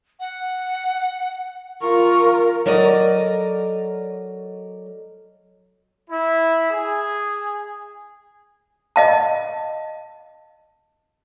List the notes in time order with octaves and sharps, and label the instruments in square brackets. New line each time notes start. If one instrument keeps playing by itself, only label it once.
[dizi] F#5
[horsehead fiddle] F4 A#4 [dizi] C#6
[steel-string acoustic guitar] F#3 A4 A#4 D5 D#5
[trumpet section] E4
G#4
[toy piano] D#5 F5 A5